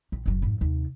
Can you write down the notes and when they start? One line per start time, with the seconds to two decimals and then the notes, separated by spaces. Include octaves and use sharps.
0.12 A#1
0.26 F#1 F#3
0.42 F2 G#2
0.61 D#2 C3